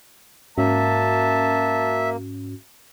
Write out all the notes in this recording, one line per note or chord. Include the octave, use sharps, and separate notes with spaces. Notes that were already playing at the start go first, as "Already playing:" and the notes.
G#2 A#3 C#4 F#4 E5 A5